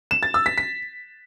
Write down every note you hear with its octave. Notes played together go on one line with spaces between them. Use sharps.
E7
A6
E6
B6
B6